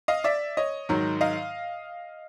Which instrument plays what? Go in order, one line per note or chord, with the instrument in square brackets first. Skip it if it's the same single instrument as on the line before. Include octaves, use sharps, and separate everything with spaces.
[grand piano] D#5 F5
D5 E5
C#5 D#5
G#2 D#3 F#3
D#5 F5